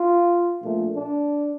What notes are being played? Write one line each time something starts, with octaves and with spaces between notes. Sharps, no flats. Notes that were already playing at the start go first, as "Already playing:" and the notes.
Already playing: F4
A#1 A#2 A3
D4